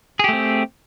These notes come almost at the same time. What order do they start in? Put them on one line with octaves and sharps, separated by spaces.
G#4 G4 A3 C4